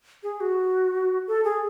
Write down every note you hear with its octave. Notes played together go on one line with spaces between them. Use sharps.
G#4
F#4
A4
G#4